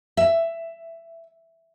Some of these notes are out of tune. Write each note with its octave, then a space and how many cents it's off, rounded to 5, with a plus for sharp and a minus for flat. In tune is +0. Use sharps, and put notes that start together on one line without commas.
E5 +10